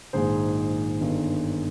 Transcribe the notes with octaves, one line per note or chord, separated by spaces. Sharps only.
A#1 G#2 D#3 G#4 C5
G1 G2 D#3